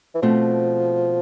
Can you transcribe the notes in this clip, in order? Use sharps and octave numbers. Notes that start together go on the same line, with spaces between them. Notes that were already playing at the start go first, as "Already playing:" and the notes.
E3
B2 F3 A3 C4